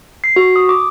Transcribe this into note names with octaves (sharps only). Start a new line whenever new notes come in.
C7
F#4
D#6
D6